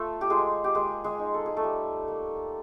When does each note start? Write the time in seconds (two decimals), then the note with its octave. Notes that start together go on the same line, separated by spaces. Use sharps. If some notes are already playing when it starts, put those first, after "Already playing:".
Already playing: A3 F4 A4
0.21 G4
0.30 G#3 F4 G#4
0.64 G4
0.75 G#3 A#3 G#4
1.04 G#3 G#4
1.19 D#4
1.34 A4
1.46 G#4
1.56 A3 A4
1.64 G3
2.08 A#3